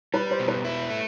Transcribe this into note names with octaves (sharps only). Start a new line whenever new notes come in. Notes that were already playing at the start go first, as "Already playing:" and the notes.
G3 B4
C5
B2
B4
E4
A3